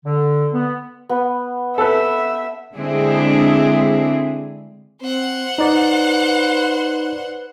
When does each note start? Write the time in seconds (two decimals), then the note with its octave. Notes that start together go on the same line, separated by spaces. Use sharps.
0.05 D3
0.54 B3
1.09 B3
1.78 A4 B4 E5
2.74 D3 G#3 C4 D4 E4 G#4
5.01 C4 C5 F#5
5.58 D#4 B4 D5